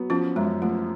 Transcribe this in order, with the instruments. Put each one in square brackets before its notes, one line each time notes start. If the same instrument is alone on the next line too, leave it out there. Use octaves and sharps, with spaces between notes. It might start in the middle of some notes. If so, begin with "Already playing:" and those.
Already playing: [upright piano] F#3 B3
[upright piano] F3 [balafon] C#4 F4
[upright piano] F#2 [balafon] G#3
[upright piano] F3 [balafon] A3